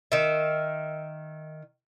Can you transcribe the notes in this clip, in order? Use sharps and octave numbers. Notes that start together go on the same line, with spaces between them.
D#3 E5